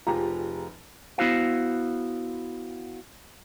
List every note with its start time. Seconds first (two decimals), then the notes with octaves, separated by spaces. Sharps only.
0.07 F1 F3 F4 G4 G#4 A#5
1.18 B3 E4 F#4 C5 F5